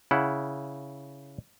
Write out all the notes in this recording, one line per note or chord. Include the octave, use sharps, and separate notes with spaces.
C#3 E4 F#5